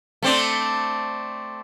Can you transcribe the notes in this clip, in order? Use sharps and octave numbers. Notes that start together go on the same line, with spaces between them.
A3 C4 D4